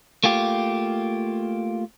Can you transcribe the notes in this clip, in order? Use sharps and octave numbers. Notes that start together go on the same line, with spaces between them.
A3 A#3 F4 G4